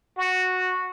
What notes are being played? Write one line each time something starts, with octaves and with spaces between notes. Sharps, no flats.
F#4